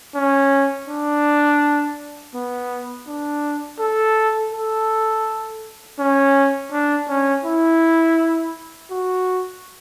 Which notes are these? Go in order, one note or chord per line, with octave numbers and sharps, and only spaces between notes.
C#4
D4
B3
D4
A4
A4
C#4
D4
C#4
E4
F#4